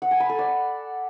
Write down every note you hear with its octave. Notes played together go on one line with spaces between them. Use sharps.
F#5
G#5
B5
A4
D5